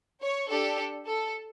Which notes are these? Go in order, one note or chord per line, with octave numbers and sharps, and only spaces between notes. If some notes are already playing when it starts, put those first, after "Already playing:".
C#5
D4 G4 A4
A4